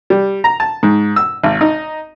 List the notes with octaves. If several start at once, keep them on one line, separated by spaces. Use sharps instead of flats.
G3
A#5
A5
G#2
E6
G#1
D#4